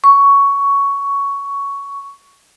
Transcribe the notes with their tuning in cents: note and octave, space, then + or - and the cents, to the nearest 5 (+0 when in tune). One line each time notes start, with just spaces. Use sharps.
C#6 +10